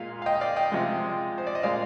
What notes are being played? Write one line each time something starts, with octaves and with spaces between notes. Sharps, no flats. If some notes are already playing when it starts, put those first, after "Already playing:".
Already playing: A#2 G#3 F5
F5
D#5 G5
D5 F5
D#5 G5
C3 F3 G#3
C5
D5
D#5
A#2 G#3 D5 F5